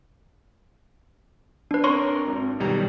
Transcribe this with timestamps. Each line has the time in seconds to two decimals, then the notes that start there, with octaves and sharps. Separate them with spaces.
1.71 D4 B4
1.84 C4 D4 A#4 C#5 C6 C#6
2.27 G#1
2.60 B1 B2 D#3 F#3 G3 A#5